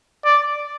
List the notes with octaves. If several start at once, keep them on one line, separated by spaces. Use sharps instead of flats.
D5